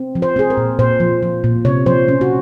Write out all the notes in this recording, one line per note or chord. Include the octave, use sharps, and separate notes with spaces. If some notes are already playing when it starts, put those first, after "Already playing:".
Already playing: C4
F3
C5
C4 G#4
A#4
A#2
A#2 C5
F3
F3
A#2
C3 C#5
F3 C5
C#4
F#4